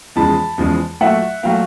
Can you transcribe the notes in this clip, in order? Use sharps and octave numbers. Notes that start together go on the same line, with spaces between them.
E2 C#3 F3 G#3 A5 B5
E2 C#3 F3 G#3
A#2 F#3 A3 E5 F#5
A#2 F#3 A3 F5 G5